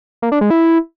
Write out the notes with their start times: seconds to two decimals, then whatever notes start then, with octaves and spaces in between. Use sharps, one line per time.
0.22 A#3
0.32 D4
0.41 G#3
0.50 E4